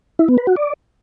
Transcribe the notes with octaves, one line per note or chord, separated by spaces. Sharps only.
E4
B3
B4
F#4
D5